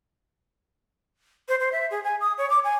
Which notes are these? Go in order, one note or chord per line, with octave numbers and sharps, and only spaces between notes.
C5
C5
E5
G#4
G#5
D#6
C#5
D6
G#5